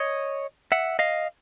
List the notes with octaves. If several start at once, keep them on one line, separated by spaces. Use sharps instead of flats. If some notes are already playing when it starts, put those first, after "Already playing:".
Already playing: C#5 D#5
E5 F#5
D#5 F5